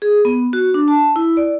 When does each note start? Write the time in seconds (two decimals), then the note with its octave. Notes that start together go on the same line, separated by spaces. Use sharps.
0.02 G#4
0.25 B3
0.53 F#4
0.74 D4
0.88 A5
1.16 E4
1.37 D5